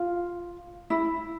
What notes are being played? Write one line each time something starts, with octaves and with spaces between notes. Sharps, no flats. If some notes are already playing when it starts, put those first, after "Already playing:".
Already playing: F4
E4